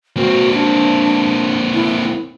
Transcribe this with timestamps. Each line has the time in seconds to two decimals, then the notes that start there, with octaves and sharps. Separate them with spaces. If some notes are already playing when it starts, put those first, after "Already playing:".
0.17 A#3 C4 F#4
0.54 D4
1.74 E4